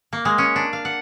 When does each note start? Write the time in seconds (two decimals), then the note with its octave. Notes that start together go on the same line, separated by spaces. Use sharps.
0.13 A#3
0.25 G#3
0.38 C#4
0.56 D4
0.73 F5
0.85 F#5